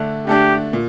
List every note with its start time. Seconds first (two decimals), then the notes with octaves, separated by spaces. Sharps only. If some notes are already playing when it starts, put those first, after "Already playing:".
Already playing: D3 A3 D4
0.27 D3 A3 D4 G4
0.73 A#2